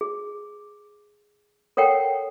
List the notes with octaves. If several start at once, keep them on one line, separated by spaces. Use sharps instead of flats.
G#4
A4 A#4 C#5 F#5 G5